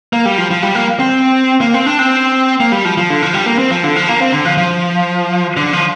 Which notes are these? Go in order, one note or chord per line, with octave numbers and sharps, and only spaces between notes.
A#3
G3
F3
F3
G3
A#3
C4
A#3
C4
D4
C4
A#3
G3
F3
F3
D3
F3
G3
A#3
C4
F3
D3
F3
A#3
C4
D3
F3
F3
D3
F3